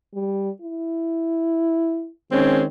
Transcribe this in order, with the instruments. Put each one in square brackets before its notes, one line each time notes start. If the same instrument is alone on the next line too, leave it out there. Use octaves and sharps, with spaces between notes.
[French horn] G3
E4
[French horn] D#3 [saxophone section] G#3 C4 C#4